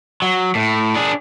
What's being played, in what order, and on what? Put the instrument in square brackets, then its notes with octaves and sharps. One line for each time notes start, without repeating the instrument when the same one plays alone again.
[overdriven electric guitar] F#3
A2
D4 G#4